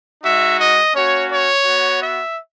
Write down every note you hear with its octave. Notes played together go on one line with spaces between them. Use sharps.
G#3 D#4 F#4 E5
D#5
A#3 C#4 F#4 C#5
C#5
B3 F#4
E5